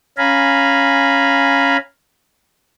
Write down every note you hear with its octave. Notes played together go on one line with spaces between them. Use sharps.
C#4 F5 G#5 A#5 B5